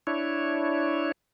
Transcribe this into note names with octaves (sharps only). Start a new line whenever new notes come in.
D4 E4 C#5